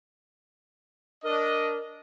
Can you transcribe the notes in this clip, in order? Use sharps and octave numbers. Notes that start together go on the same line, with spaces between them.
D4 A#4 D#5